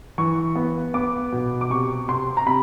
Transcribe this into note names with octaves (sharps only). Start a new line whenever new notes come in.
E3 C#6
B3
B3 D6
B2
D6
C3 C#6
C3 C6
A#5
C3 B5